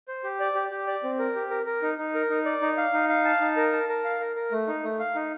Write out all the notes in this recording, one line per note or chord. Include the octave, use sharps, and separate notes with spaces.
C5
G4
D5
G4
G4
D5
C4
A#4
G4
A#4
A#4
D#4
D#4
A#4
D#4
D5
D#4
F5
D#4
F5
A5
D#4
A#4
A5
A#4
F5
A#4
A#4
A3
D#4
A3
F5
D#4